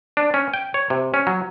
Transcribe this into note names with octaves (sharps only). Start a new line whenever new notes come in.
D4
C#4
G5
C#5
C3
C#4
F#3